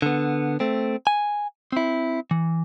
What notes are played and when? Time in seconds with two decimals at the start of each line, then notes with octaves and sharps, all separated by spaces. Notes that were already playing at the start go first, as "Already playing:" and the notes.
0.02 D3 B3
0.60 A3 C4
1.07 G#5
1.72 C4 E4
2.31 E3